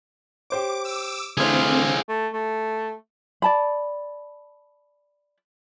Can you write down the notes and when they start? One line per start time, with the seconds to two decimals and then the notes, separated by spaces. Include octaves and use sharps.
0.50 G4 C5 C#5 D6
0.85 D6 E6
1.38 D3 E3 A3 C4 F4 G#4 C5
2.08 A3
2.33 A3
3.42 D5 A5 B5